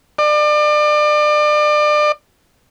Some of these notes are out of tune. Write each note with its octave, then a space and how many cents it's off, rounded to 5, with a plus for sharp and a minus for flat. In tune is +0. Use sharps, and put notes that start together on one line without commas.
D5 +35